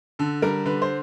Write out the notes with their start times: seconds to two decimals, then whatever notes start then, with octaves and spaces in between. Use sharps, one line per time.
0.19 D3 A4
0.42 G3 A#4
0.66 D3 B4
0.82 C5